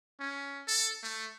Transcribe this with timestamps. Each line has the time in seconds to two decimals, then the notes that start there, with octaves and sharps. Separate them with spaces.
0.20 C#4
0.67 A4
1.03 A3